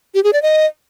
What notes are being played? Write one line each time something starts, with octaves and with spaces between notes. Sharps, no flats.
G4
G#4
D5
D#5